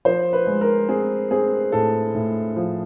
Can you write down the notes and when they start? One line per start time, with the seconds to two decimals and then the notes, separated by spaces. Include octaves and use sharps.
0.05 F3 C5
0.33 B4
0.47 G#3
0.61 A#4
0.89 C4 G#4
1.31 C4 G#4
1.72 A2 A4
2.15 A2
2.56 F3